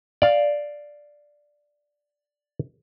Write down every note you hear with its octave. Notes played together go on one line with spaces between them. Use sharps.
D5 F5